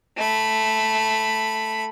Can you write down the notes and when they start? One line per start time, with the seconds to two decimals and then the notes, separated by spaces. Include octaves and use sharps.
0.17 A3 B5